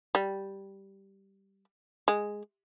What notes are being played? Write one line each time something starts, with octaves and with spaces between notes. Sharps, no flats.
G3
G#3